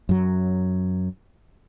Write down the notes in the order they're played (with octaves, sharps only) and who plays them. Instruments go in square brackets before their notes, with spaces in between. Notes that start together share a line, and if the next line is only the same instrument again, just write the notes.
[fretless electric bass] F#2 F#3